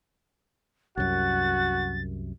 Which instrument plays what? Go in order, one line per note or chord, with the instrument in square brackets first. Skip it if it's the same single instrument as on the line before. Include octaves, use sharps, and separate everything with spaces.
[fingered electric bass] C2 F#2 [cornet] F#4 [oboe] F#5 [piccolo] A6